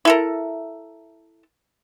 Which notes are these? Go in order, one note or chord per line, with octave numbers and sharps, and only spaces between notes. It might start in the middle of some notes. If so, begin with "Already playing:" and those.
E4 A4 A#4